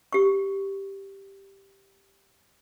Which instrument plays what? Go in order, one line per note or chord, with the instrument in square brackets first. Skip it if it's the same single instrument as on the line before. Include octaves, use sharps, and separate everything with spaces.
[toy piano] G4 C#6